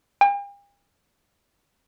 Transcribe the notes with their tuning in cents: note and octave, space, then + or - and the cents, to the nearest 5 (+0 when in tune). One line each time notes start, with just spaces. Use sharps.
G5 +45